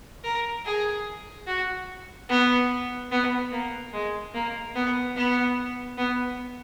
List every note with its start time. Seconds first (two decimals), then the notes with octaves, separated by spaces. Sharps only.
0.24 A#4
0.65 G#4
1.47 F#4
2.29 B3
3.12 B3
3.52 A#3
3.93 G#3
4.34 A#3
4.75 B3
5.16 B3
5.97 B3